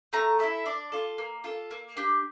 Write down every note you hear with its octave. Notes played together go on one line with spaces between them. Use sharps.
A3 A#5
E4 A4 E5
D4 D5
F4 A4
A#3
F4 A4
A#3
D4 G4